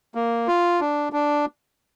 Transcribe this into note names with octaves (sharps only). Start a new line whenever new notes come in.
A#3
F4
D4
D4